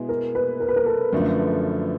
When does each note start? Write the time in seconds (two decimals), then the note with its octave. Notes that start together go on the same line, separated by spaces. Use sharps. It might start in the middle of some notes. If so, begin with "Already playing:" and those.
Already playing: B2 G#3 B3 E4
0.09 A#4
0.35 B4
0.60 A#4
0.68 B4
0.76 A#4
0.86 A4
1.13 F#2 D3 F3 A3